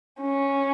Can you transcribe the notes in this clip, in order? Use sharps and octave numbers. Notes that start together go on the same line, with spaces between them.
C#4